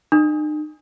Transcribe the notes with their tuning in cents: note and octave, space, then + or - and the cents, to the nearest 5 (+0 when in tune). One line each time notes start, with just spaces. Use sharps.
D#4 -45